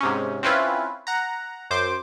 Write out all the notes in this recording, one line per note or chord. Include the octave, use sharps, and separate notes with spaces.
G#2 C3 C#4
C4 C#4 E4 F4 B4
F#5 A#5
F#2 C5 D6